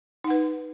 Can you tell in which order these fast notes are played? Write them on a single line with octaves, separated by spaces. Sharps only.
D#4 F#5 B4